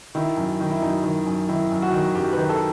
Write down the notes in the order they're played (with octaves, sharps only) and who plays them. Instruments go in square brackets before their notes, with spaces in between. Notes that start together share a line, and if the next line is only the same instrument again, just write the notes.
[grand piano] D#3 E4
F#2
D#3
E4
F#2 D#4
D#3
F#2
D#3 E4
F#2
F#4
D#3
F#2 G4
D#3 B4
A4